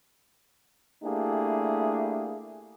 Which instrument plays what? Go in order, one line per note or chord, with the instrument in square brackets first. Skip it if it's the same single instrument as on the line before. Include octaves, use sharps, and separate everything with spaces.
[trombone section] A3 A#3 D4 E4 G4 G#4